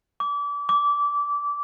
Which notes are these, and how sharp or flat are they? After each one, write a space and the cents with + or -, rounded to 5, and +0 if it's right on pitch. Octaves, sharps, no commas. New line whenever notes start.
D6 -30
D6 -20